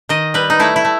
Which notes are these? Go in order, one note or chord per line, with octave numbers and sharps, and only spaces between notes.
D#3 D#5
G3 B4
D#4
A3 E4
E4
A3